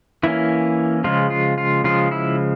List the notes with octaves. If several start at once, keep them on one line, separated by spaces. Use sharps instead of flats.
E3 A#3 C#4 E4
C#3 F3 G#3 F4
F4
F4
C#3 F3 G#3 F4
E4